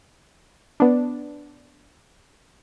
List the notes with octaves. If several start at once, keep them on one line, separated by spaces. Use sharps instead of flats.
B3 D4